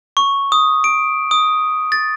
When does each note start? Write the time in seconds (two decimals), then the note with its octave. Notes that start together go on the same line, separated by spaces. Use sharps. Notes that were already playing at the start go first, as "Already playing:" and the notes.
0.17 C#6
0.52 D#6
0.84 D7
1.31 D#6
1.92 A6